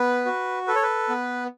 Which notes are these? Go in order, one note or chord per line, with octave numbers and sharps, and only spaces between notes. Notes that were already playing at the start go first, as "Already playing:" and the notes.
Already playing: B3 B4
F#4
A4 B4
C#5
B4
B3